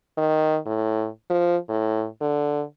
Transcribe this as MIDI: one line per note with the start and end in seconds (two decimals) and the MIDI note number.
0.18 0.58 51
0.66 1.08 45
1.30 1.57 53
1.69 2.06 45
2.21 2.63 50